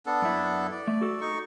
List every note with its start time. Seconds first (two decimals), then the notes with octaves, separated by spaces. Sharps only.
0.06 B3 D4 A4
0.22 F#2 E4
0.71 D5
0.87 A3
1.01 F#4 A4
1.21 D#4 C#6